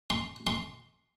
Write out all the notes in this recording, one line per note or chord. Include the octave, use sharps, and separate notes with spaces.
C6
C6